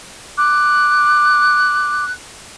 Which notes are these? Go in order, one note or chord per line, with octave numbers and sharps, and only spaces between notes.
D6 F#6